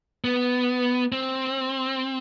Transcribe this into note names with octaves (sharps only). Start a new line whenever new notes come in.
B3
C4